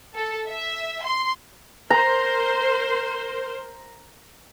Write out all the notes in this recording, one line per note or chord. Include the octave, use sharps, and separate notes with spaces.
A4
E5
C6
A#4 C5 A#5